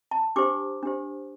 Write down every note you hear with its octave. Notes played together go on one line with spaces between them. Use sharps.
A5
D4 G4 C5 D6
D4 G4 C5